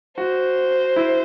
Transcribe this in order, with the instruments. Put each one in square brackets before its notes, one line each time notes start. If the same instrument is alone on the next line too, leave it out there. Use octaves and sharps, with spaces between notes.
[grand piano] F#4 [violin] C5
[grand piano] E4